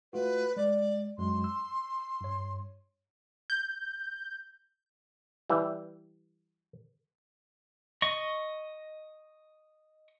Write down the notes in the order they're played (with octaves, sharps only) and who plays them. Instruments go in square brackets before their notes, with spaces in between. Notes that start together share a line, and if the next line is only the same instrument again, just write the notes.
[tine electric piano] A3 F4 F#4 [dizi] B4
[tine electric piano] G#3 [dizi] D5
[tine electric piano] F#2 F#3 G#3 [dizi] C6
[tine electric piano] E6
G2 C#5
[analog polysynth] G6
[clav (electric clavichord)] E3 G3
[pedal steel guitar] D#5 C#6